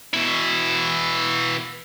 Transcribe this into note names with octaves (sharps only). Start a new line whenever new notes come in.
B2 E4